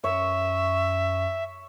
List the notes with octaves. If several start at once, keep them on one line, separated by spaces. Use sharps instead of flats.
F#2 C#5 E5